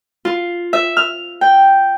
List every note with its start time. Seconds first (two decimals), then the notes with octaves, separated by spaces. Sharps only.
0.25 F4
0.73 E5
0.97 F6
1.41 G5